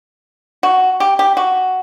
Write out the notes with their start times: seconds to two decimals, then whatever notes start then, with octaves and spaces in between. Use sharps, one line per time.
0.63 F#4
1.00 G4
1.19 G4
1.37 F#4